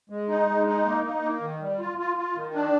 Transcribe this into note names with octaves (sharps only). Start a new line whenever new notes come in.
G#3
D#4
G#3
D#4
A#3
D#4
A#3
D#3
G3
F4
F4
F4
D#3
D4